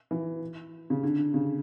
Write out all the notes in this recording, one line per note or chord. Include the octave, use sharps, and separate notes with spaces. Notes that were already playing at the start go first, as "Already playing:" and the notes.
E3
C#3
D3
C#3